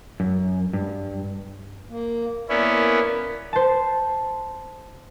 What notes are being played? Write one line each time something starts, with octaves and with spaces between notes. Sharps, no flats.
F#2
G2
A#3
A#3 B3 C#4 E4 A#4 D5
C5 A5